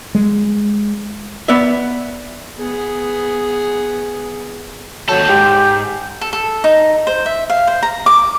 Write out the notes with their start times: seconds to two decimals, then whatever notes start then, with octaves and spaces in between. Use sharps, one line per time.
0.15 G#3
1.48 B3 D5 E5
2.58 B3 G#4
5.09 D#2 F#3 A4 G6
5.29 G#2 G4
6.21 A4
6.33 A4
6.64 D#4
7.07 C5
7.26 E5
7.50 F5
7.67 C5
7.83 A#5
8.06 D6